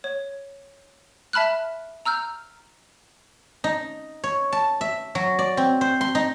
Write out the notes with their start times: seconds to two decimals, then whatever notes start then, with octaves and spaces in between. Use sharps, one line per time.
0.04 C#5
1.33 E5 A5 B5 F6 F#6
2.06 A#5 E6 F6 G6
3.64 D#4
4.24 C#5
4.52 A5
4.81 E5
5.15 F#3
5.39 D5
5.57 C4
5.81 C5
6.01 C6
6.15 D#4